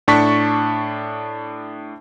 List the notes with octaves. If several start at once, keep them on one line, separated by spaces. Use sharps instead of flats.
A2 D4 A5 C#6 B6